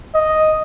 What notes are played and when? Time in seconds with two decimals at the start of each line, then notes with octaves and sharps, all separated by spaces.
0.15 D#5